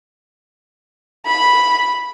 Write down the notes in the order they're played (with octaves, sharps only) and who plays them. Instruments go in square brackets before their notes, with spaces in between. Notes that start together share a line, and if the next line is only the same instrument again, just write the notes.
[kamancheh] B5